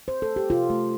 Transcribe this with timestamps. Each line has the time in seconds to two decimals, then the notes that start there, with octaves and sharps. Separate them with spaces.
0.08 C5
0.22 A4
0.36 G4
0.50 C3 F4
0.70 A3